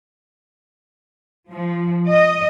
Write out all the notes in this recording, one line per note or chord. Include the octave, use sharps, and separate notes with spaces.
F3
D#5